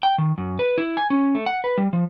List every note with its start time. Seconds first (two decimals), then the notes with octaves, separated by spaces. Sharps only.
0.03 G5
0.18 D#3
0.38 F#2
0.59 B4
0.78 E4
0.97 G#5
1.10 C#4
1.35 A3
1.46 F#5
1.64 B4
1.78 G3
1.93 F3